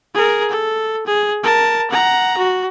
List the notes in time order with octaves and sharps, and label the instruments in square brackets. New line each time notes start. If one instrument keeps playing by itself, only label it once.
[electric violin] G#4 A#4
A4
G#4
A#4 A5
F#5 A#5
F#4